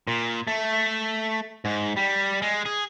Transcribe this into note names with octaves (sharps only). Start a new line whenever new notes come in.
A#2
A3
G#2
G3
G#3
G#4